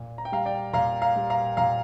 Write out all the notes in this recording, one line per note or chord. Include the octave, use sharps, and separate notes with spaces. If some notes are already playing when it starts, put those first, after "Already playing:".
Already playing: A#2
A#5
G5
G3 F5 A#5
D5 G5
A#2 F5 A#5
F5 A#5
G3
F5 A#5
A#2 F5 A#5